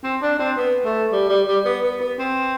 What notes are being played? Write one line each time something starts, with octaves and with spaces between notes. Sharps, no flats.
C4
D4
C4
B3
A3
G3
G3
G3
B3
B3
B3
C4